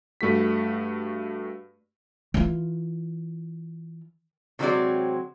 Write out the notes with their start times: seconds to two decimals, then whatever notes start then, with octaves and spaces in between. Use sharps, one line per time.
0.21 G2 A3 F#4 B6
2.34 E3 F4
4.59 C3 E3 F#3 G#3 C4 D5